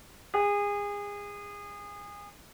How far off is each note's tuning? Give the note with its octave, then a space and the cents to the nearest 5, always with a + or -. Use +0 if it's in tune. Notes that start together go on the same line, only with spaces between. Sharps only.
G#4 -30